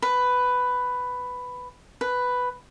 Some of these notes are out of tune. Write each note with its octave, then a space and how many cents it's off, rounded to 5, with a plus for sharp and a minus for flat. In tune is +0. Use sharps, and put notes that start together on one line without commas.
B4 +10
B4 +5